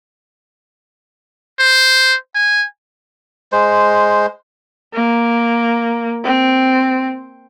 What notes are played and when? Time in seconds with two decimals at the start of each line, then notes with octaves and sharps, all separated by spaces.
1.59 C5
2.35 G#5
3.52 G#3 C5
4.94 A#3
6.24 C4